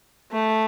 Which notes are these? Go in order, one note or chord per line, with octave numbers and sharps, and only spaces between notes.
A3